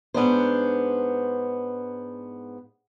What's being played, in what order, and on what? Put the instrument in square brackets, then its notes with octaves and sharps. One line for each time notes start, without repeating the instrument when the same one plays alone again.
[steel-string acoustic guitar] G#2 B3 D4 C5